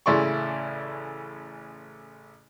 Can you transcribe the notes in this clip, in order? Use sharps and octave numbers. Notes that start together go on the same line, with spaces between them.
A1 C#3 E4 D5 C6 C#6